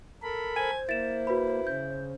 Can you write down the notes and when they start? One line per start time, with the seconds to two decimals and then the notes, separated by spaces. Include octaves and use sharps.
0.23 A4 A#4 B5
0.56 C5 G#5 G#6
0.89 A#3 E4 A6 E7
1.27 F#4 B4 B5
1.67 C#3 G6